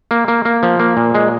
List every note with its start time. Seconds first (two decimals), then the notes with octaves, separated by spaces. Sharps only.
0.11 A#3
0.28 A#3
0.45 A#3
0.63 F3
0.80 A#3
0.97 A#2
1.15 G#3